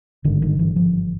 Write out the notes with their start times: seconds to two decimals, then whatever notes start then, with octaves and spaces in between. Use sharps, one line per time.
0.24 G#1 G2 D3 D#3
0.42 D#3
0.59 E3
0.76 F3